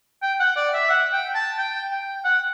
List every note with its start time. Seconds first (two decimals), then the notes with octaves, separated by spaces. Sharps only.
0.22 G5
0.40 F#5
0.56 D5
0.74 E5
0.90 F#5
1.13 G5
1.35 A5
1.58 G5
1.91 G5
2.25 F#5